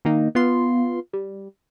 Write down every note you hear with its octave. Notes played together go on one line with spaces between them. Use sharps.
D#3 A#3 D#4
B3 F4 C6
G3